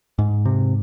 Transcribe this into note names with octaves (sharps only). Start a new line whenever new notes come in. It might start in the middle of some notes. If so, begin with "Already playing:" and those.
G#2
C3